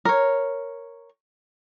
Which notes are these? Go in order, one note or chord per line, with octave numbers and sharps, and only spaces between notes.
A#4 C#5